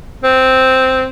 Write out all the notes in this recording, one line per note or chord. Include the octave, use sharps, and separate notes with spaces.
C4